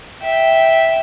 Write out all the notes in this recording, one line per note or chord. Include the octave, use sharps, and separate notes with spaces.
E5 G5